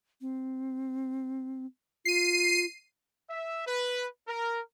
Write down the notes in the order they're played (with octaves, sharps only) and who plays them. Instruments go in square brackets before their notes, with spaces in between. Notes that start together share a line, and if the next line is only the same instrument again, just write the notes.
[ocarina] C4
[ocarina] F4 [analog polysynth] C7 D#7
[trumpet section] E5
B4
A#4